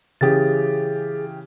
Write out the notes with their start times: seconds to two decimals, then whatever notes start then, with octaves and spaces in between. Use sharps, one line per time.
0.21 C#3 E3 G4 G#4 A6